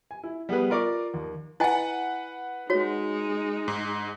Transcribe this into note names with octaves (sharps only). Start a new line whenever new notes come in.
G#5
E4
G3 B3 G4 G#4 B4
F4 A#4 D5 C#6 D6
D#2
E4 B4 D#5 F#5 G#5
G#3 D#4 F#4 C#5
G#2